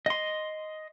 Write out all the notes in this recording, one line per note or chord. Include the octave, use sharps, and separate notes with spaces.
D#5 C6